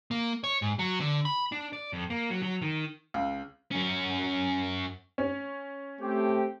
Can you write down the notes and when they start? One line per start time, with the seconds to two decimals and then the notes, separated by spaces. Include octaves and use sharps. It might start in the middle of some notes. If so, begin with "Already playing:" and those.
0.11 A#3
0.44 C#5
0.62 G#2
0.79 F#3
1.00 D3
1.25 B5
1.52 D4
1.73 D5
1.93 F2
2.10 A#3
2.30 F#3
2.43 F#3
2.62 D#3
3.14 C#2
3.71 F#2 C#4
5.18 C#4
6.00 A3 C4 G4